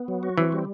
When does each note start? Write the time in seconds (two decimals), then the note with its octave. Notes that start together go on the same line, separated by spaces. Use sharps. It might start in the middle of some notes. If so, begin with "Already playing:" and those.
Already playing: B3
0.08 F#3
0.23 F#4
0.38 E3 C4
0.52 G3